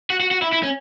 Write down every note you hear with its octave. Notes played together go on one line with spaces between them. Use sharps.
F#4
F#4
F#4
E4
E4
C#4